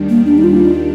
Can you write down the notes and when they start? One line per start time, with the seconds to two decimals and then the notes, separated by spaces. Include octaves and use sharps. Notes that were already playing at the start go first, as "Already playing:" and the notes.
Already playing: D#2 D#3 G3 D4
0.09 A#3
0.26 D4
0.38 D#4
0.44 F4